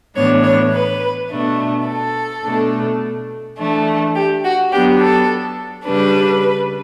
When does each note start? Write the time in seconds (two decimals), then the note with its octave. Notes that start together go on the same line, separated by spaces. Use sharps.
0.15 A2 E3 B3 D4 C#5
0.44 C#5
0.73 B4
1.29 B2 A3 D4
1.87 A4
2.43 B2 A3 D4
3.57 E3 A3 D4
4.14 G4
4.44 F#4
4.71 F#3 B3 D4 G4
5.00 A4
5.86 C#3 G3 D4 B4